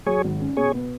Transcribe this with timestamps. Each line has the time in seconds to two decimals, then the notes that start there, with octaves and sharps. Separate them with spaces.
0.06 F#3 G#4 C#5
0.24 G#1
0.40 C#4
0.57 B2 G#4 C#5
0.74 B3